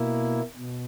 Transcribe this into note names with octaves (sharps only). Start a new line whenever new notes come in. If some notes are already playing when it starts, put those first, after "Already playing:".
Already playing: B2 A#3 E4
B2